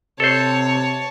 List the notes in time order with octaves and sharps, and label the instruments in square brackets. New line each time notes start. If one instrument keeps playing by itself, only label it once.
[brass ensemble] C3 [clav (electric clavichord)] A4 C5 [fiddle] C#5 A5